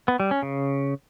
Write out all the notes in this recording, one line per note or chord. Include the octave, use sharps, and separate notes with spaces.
B3
G3
C#4
C#3